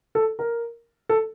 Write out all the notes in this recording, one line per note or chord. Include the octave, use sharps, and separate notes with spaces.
A4
A#4
A4